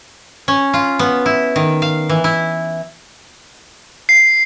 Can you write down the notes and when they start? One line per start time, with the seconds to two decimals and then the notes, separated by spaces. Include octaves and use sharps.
0.48 C#4
0.74 F4
0.99 B3
1.26 E4
1.56 D#3
1.82 F5
2.09 E3
2.24 E4
4.09 C7